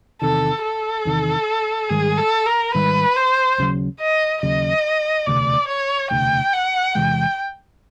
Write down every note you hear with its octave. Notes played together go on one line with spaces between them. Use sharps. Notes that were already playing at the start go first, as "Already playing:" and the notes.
E2 C3 D#3 A4
A4
E2 C3 D#3
G#2 D#3 G3 G#4
A4
A#4
G#2 D#3 G3 B4
C5
D#2 C#3 F#3
D#5
D#2 C#3 F#3 D#5
E1 D2 C3 D5
C#5
E1 D2 C3 G5
F#5
E2 C3 E3 G#3 G5